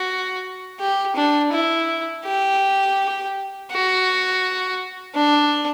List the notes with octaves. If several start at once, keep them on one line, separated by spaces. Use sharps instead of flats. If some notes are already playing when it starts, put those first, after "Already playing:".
Already playing: F#4
G4
D4
E4
G4
F#4
D4